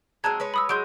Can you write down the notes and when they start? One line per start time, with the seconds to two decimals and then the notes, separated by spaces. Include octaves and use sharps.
0.24 F#3 G#3 C4 A5 A#5 G#6
0.40 G#3 B4 C#5
0.54 B5 D#6 E6
0.69 F#3 G#3 C6 G6 D7